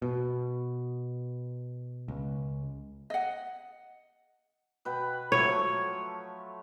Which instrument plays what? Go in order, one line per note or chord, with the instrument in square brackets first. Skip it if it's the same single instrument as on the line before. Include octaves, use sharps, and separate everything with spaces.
[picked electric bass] B2
C#2
[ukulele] D#5 F#5
[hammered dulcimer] B2 B4 G5
[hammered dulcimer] F3 F#3 A3 [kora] C#5